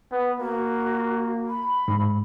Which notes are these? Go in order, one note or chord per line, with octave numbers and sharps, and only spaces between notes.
B3
A#3 F#4
B5
G#2